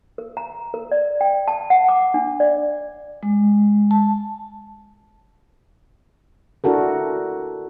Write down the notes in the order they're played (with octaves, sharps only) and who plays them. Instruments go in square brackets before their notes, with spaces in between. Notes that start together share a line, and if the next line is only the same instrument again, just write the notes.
[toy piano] A#4
A#5
A#4
D5
G5
A5
F#5
D6
D4
D5
[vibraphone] G#3
A5
[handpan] D4 E4 F#4 A4 A#4